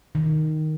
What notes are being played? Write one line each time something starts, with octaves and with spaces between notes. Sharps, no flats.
D#3